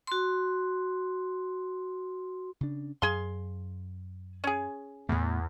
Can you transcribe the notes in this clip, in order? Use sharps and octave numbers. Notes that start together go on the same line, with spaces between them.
F#4 C6
C#3 D4
F#2 G#4 F5 C6
C#4 G#4
E2 A2 A3 B3